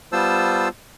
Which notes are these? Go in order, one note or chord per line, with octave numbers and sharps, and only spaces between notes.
G3 B3 F4 C5 A5 E6